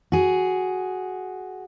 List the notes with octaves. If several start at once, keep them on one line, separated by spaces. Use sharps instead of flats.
F#4 G#4